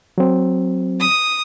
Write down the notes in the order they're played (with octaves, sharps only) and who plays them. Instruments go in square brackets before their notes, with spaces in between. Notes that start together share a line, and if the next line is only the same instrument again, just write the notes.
[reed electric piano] F#3 C4
[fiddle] D#6